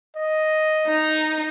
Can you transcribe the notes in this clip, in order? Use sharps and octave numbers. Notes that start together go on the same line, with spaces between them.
D#5
D#4